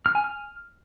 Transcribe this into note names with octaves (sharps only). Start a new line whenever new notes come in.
F6
G#5
F6